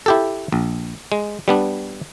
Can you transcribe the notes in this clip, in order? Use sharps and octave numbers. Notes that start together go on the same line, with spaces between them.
E4 G4 A4
A#1
G#3
G3 B3 D4